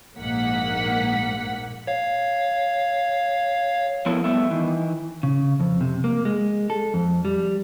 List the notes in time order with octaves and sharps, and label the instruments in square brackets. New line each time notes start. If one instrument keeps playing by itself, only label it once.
[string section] A#1 G#2 A#3 F#5 B6
[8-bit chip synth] C#5 F5
[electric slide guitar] F3 B3 E4 A4 A#4 C#5
G3 A3 B3 E5
D#3 E3
[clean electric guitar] C#3
F2
C3
A#3
G#3
A4
F2
G3